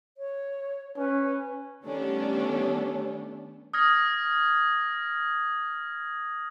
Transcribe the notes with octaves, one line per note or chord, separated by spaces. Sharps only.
C#5
C#4 B4
D#3 G3 A3 B3 C#4 D4
D#6 F6 G#6 A#6